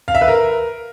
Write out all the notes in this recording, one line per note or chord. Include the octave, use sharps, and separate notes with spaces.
F5
E5
B4
A#4